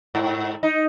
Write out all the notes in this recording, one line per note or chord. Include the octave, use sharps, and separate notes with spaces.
G#2
D#4